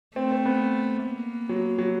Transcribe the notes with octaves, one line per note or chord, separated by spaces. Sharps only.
A3 C4
C4
B3
A#3
F#3
F#3